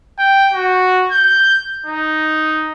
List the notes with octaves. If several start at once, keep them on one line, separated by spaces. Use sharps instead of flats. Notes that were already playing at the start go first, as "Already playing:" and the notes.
G5
F#4
G6
D#4